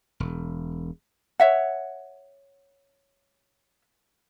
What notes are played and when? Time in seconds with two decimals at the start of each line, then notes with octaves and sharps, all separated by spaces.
0.20 E1
1.40 C#5 E5 F#5